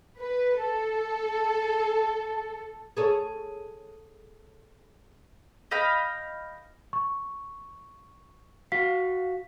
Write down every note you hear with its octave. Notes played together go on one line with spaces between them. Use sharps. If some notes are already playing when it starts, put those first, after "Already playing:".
B4
A4
G#4 A4 C#5
D#5 F5 G5 B5
C#6
F#4 F5 B6